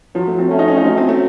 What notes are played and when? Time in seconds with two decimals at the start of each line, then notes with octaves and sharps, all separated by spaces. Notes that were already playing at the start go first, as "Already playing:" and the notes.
0.15 F3 F#3
0.28 A3
0.39 C4
0.50 A3 C#4
0.59 D#4
0.68 C#4
0.77 D#4
0.85 F#3 C#4
0.97 C4
1.09 A3